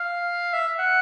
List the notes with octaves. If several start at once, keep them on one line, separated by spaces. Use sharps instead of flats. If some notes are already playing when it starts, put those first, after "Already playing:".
Already playing: F5
E5
F#5